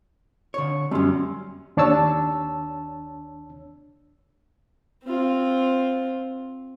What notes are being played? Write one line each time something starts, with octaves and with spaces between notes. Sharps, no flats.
D3 C#5
F#2 G3 C#4 C6
D#2 D4 C#5 A5 E6
C4 F4